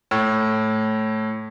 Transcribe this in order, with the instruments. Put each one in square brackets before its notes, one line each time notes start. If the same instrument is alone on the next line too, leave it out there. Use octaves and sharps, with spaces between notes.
[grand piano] A2